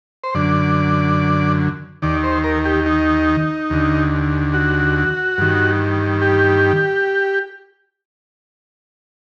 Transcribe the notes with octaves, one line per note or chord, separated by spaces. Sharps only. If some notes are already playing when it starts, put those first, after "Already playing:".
C5
F#2 D3 D5
D#2 D#3 D5
C5
A#4
G4
D#4
D#2 D3
F#4
G2 D#3
G4